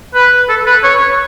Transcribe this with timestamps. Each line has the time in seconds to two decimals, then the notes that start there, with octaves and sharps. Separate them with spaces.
0.15 B4
0.49 A4
0.66 B4
0.84 C#5